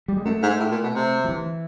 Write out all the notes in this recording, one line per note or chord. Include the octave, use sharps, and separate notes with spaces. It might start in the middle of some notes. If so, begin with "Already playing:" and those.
G3
G#3
F#2 A3
G#2
A2
A#2
B2
C3
F3
E3